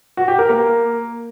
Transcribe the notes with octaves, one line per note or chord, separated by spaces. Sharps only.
F#4
G4
A#4
A#3